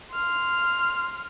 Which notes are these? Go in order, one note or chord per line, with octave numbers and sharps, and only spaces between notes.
C6 F6